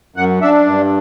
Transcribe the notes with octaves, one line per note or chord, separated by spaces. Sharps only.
F#2 F#5
D4 E5
G2